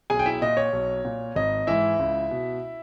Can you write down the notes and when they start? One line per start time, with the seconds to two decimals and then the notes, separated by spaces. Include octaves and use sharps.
0.10 B1 G#4 G#5
0.19 G5
0.26 E4 E5
0.42 A#2 D#5
0.57 C#5
0.73 B1
1.05 A#2
1.35 G#1 D#5
1.67 G#2 E3 E4 E5
1.99 C#2
2.31 B2